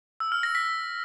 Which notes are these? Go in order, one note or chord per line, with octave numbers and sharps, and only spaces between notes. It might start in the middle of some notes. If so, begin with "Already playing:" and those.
E6
F6
A#6
B6